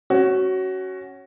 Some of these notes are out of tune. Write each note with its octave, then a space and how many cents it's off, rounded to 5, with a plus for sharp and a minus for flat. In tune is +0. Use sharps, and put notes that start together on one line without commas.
C#4 +0 F#4 +20